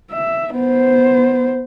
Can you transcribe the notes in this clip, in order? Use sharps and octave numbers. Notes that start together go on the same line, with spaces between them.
E5
B3 C5